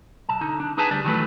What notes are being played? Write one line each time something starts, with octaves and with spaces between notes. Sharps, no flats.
B1 A5
D3 D#4
D4
D#4 G#4 B4 G#5 A5
D2 G3 D4
D#3 E3 F#3 G#3 A3 B4